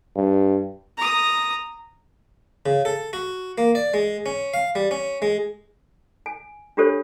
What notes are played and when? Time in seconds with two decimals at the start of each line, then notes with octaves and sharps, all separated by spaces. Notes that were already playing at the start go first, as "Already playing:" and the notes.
0.16 G2
0.98 A#5 D#6
2.66 C#3
2.85 A4
3.13 F#4
3.58 A#3
3.75 D5
3.94 G#3
4.26 C#4
4.54 F5
4.75 G3
4.91 C#4
5.22 G#3
6.26 G#5
6.77 D4 F4 G4 A4 C5 C#5